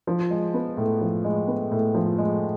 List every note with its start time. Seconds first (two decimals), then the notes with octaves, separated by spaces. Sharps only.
0.07 F3
0.30 G#3
0.54 B3
0.77 A2
1.01 F3
1.24 G#3
1.48 B3
1.72 A2
1.94 F3
2.18 G#3